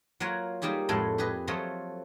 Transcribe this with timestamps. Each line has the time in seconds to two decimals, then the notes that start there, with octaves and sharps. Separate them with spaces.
0.20 F#3 A#3 F4 C#5 F#5 A#5
0.62 G3 A#3 D#4 G4 G#4
0.89 F2 A2 G#3 E4 A4 A5
1.18 G4 G#4 B4 D#5
1.47 F3 F#3 A3 C5 C#5 D#5